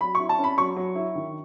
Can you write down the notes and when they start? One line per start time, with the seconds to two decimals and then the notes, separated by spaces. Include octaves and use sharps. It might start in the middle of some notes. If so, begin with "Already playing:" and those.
0.01 F#3 B5
0.15 E4 C#6
0.29 A5
0.39 C#4 B5
0.57 F#3 C#6
0.76 F#3
0.95 E4
1.15 D#3